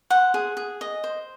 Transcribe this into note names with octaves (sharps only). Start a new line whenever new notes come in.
C5 F#5
G#4
G#4
D#5
C5